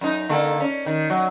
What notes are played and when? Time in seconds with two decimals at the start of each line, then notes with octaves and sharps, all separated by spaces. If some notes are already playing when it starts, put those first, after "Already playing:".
0.01 F#2 D#4
0.29 D3 A#3 A4
0.60 C#4
0.86 D#3
1.10 F#3